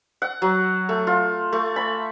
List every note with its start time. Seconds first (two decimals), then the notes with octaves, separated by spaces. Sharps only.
0.22 F#5
0.42 F#3
0.89 A3
1.07 F4
1.52 A3
1.76 B5